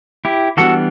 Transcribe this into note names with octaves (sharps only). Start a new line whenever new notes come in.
E4 G4
E3 G3 B3 D4 F#4 A4